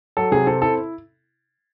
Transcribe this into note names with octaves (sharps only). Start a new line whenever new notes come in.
F#3 A4
C3 G#4
C4 A4
E4 A4